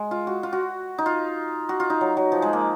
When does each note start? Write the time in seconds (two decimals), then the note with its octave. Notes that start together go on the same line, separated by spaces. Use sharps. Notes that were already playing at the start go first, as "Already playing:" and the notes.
Already playing: G#3
0.11 F4
0.27 F#4
0.43 F4
0.53 F#4
0.98 D#4
1.06 F4
1.69 F#4
1.80 F4
1.90 D#4
2.01 F#3
2.17 F#3
2.32 F3
2.42 G#3
2.53 A#3